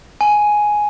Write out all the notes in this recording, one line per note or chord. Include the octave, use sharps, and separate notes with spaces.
G#5